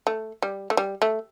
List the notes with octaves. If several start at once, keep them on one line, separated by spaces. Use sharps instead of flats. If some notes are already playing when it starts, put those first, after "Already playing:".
A3
G3
A3
G3
A3